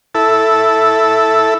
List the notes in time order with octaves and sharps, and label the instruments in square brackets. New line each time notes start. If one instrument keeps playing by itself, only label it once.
[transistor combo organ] E4 A4